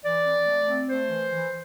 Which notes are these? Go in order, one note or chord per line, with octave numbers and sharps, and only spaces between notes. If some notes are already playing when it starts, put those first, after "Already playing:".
E3 D5
C4
A3
C4
A3 C5
E3
E3